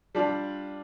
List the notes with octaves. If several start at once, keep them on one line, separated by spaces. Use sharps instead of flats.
G3 D4 F4